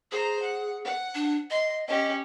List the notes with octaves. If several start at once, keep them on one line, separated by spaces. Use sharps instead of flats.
G#4 C5 A#5
F#5
F#5
D4
D#5 C6
C#4 G4 D#5